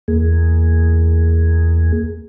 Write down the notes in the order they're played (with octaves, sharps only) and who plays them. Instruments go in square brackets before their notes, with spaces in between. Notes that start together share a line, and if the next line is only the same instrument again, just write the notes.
[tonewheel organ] E2 A#3 G#4